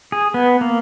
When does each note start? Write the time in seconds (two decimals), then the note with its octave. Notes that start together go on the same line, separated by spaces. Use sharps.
0.12 G#4
0.34 B3
0.61 A#3